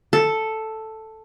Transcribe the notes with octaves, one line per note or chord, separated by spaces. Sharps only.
A4